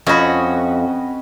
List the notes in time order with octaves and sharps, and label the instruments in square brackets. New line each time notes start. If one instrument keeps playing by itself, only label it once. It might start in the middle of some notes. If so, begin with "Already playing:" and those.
[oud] F2 [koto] C#4 F#4 [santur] D#5 B5